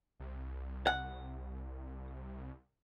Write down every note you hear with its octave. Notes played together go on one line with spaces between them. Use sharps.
C2
F#5